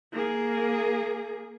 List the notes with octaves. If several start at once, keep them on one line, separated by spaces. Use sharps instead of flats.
A#3 G#4